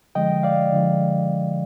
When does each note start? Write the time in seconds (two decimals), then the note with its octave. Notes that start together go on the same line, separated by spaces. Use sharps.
0.15 D3 F3 G#3 D#5 G5
0.43 D5 F5
0.72 D3 F3 G#3